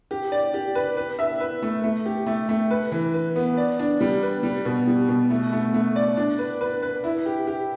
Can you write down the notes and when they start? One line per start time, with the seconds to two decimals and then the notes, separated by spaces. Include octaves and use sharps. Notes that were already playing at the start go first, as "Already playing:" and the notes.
0.11 G4
0.32 D5
0.54 G4
0.75 B4
0.97 B4
1.19 E5
1.40 B4
1.62 A3
1.84 A3
2.06 G4
2.26 A3
2.49 A3
2.71 B4
2.92 E3
3.14 B4
3.36 B3
3.57 D5
3.79 D4
4.01 G3
4.23 B4
4.43 G3
4.65 B2
4.87 G3
5.08 B2
5.30 A3
5.52 A3
5.74 A3
5.96 D5
6.17 D4
6.39 B4
6.61 B4
6.82 B4
7.04 E4
7.26 G4
7.47 G4